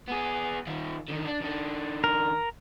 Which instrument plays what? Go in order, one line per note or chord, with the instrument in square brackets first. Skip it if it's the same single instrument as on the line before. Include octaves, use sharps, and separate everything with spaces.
[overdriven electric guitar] B3 G#4
D#3 F4
D3 D#3
D4
D#3 D4
[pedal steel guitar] A#4